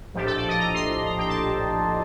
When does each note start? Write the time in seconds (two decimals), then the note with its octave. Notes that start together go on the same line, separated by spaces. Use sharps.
0.14 A#1 A2 F3 A3 D4 G4
0.26 A4
0.37 D5
0.48 D#5
0.59 A#5
0.74 C6
0.90 C6
1.05 A#5
1.19 G5
1.28 A5